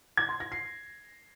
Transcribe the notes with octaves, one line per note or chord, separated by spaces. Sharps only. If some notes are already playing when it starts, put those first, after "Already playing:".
G#6
C6
A#6
C7